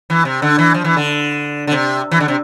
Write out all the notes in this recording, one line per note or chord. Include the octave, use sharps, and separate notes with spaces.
E3
C3
D3
E3
F3
E3
D3
D3
C3
E3
D3
C3